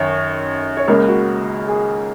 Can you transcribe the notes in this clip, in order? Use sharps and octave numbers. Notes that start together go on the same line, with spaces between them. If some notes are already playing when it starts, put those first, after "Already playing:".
Already playing: F#2 D#3 C#5
C#5
C#2 C#3 A#3 A#4
F#4
G#4